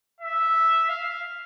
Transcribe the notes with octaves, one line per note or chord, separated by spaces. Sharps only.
E5
F5